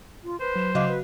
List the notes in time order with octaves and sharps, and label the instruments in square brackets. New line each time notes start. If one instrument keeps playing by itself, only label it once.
[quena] F4
[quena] B4 [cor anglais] C5
[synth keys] F#3 E7
[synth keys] C#3 F#3 [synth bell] F#4 D#5 F5 [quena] D6
[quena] B4 [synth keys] F#6